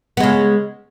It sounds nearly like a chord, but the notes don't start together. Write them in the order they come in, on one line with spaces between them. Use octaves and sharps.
B3 G#3 C#3